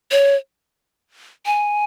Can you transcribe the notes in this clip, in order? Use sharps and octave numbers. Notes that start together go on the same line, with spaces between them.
C#5
G#5